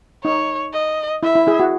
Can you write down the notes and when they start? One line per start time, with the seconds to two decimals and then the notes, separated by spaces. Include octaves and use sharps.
0.24 D#4 C#5
0.73 D#5
1.23 E4 E5
1.35 E4
1.47 E4 G#4
1.60 F#4